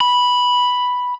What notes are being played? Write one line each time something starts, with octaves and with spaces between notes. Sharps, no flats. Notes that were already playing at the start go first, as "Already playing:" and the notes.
B5